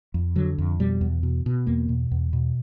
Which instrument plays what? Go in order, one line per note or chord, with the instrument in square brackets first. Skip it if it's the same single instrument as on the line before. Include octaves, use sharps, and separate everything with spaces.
[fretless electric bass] F2
D3 F#3
F2
B2 G3
E2
B2
B2
E2 A#3
B2
E2
B2